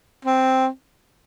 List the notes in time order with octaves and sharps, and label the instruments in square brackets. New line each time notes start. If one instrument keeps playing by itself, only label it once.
[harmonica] C4